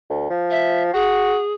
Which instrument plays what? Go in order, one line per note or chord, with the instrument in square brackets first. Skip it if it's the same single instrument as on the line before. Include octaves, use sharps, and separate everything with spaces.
[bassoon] D2
F3
[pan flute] E5
[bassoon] F#4 [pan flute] G#4